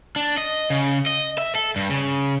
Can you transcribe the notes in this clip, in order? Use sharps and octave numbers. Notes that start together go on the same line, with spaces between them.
D4
D#5
C#3
D#5
E5
A4
G2
C#3